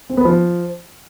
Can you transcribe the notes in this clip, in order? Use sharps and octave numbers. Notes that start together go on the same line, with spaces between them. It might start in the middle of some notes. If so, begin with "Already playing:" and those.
C4
B3
F3